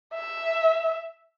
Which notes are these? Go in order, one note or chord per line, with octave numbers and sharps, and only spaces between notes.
E5